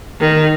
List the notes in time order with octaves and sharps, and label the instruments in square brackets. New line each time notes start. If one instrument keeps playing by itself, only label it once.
[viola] D#3